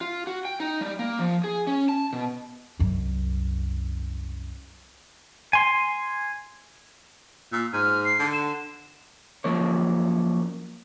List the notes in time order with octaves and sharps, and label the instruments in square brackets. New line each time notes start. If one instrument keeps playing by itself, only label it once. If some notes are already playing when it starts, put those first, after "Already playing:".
[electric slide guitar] F4
F#4
G5
D#4
G3
A#3
F3
G#4
C#4
A5
B2
[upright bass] C2 F#2
[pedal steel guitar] G#5 C6
[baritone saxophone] A#2 [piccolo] E6
[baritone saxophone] G#2 [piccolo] F6
[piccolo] C7
[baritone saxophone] D3
[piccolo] E7
[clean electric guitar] F#2 F3 A#3 C#5